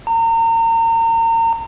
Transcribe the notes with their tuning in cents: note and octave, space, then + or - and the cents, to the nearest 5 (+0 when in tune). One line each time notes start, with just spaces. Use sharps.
A#5 -35